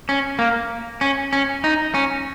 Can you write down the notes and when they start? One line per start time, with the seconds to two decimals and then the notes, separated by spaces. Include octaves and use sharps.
0.09 C#4
0.39 A#3
1.01 C#4
1.33 C#4
1.64 D#4
1.94 C#4